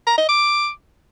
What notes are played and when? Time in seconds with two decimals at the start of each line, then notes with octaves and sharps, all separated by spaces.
0.07 A#5
0.18 D#5
0.29 D6